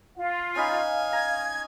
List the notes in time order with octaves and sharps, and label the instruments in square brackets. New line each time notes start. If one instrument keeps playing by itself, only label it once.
[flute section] F4 [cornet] F5
[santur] C#4 D#4 B5 [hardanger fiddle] G#5
[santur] A#5 [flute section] G#6